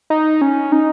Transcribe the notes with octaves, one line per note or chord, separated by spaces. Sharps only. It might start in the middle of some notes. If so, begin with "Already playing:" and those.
D#4
C#4
D#4